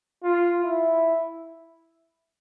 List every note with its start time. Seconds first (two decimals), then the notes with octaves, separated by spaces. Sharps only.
0.23 F4
0.61 E4